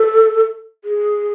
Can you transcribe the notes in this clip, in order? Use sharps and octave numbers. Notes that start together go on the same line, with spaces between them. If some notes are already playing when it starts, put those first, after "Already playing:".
Already playing: A4
G#4